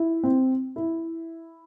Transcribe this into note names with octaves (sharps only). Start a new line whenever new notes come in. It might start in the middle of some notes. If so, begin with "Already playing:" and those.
Already playing: E4
C4
E4